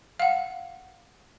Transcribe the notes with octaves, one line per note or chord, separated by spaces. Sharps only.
F5 F#5